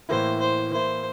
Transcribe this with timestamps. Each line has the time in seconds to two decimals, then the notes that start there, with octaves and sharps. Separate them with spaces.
0.09 A2 E3 A#3 E4 C5
0.40 C5
0.72 E3 A#3 E4 C5